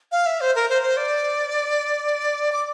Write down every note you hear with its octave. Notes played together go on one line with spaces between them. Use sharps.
F5
E5
C5
A#4
C5
C5
D5
D6